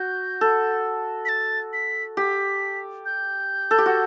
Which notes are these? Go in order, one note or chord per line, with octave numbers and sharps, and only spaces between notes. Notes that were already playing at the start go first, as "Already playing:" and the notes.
Already playing: F#4 G6
A4
B6
A6
B6
G4 B6
G6
A4
G4
F#4